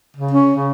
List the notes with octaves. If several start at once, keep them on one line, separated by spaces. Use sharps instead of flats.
C#3
C#4
C#3